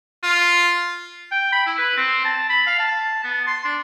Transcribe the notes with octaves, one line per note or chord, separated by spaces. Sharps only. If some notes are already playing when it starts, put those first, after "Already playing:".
F4
G5
B5
E4
B4
C4
A5
B5
F5
A5
B3
C6
D4